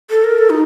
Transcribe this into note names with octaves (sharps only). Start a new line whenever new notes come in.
A4
A#4
A4
D#4